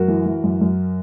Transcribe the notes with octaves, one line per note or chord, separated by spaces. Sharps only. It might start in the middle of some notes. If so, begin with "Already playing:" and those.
Already playing: F#2 F#4 A#4
E3
E3
F#2
F#2